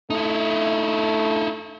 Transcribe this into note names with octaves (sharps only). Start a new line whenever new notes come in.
A3 D#4 E4